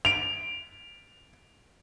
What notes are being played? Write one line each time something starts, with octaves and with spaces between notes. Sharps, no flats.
D7 F7